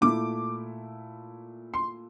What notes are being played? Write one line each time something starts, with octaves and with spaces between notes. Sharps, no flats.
A#2 A3 E4 D6
C6